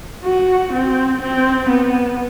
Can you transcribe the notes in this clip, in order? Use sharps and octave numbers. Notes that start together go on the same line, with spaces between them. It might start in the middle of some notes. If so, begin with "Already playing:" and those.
F#4
C4
C4
B3